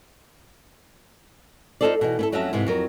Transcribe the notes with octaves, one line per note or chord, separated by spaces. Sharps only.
D#4 F4 G#4 A4 C5 D5
B2 E3 D#4
B3 E4 A4
F2 F#3 C#4 F#4 E5 A5
G#2 C3 E3
F2 F#3 A#4